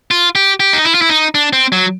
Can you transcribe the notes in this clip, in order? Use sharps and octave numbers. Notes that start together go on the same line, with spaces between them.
F4
G4
G4
D#4
E4
F4
E4
D#4
D4
C4
F#3